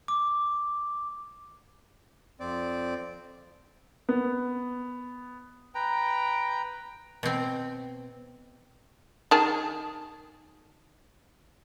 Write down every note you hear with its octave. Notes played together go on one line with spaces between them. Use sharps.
D6
F2 C4 D5
B3
B4 G5 A#5
B2 C4
D#3 G#4 A5